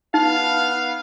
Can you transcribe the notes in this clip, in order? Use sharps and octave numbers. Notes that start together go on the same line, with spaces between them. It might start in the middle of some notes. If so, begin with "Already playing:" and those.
B3 D#4 F5